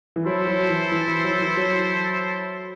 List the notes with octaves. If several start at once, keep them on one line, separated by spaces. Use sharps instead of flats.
E3
F#3 E4 A4 C5
F#3
E3
E3
E3
F#3
E3
F#3